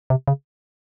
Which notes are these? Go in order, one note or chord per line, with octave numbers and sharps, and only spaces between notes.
C3
C#3